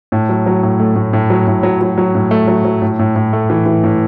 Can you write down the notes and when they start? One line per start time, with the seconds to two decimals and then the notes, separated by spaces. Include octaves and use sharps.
0.12 A2
0.29 F#3
0.46 F#3
0.63 A2
0.80 A3
0.96 A2
1.13 A2
1.30 F#3
1.47 A2
1.63 F#3
1.81 F#3
1.98 F#3
2.15 A2
2.31 A3
2.48 F#3
2.65 F#3
2.82 A2
2.99 A2
3.16 A2
3.33 A3
3.50 E3
3.66 E3
3.84 A2